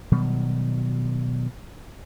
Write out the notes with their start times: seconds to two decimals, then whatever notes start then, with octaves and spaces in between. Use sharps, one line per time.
0.12 B2 D#3 F#3 G3